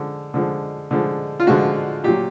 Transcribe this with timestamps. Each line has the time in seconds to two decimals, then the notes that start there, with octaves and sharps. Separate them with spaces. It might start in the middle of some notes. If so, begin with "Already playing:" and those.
Already playing: D3 F3 G#3
0.34 D3 F3 G#3
0.91 D3 F3 G#3
1.40 F4
1.47 D3 F3 G#3 F#4
2.04 A#2 F#3 G4